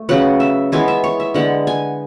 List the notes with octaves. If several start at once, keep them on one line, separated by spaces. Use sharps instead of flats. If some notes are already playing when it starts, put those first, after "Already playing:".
Already playing: A3
C#3 F#3 B3 F#5
E5
E3 G#3 B3 G#5
E5
C#5
E5
D3 G#3 B3 F#5
G#5